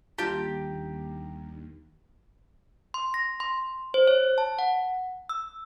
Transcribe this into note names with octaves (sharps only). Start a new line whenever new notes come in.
D#2 G3 D4 F4 G4 A5 A#5
C6
A#6
C6
C5
C#5
A5
F#5
E6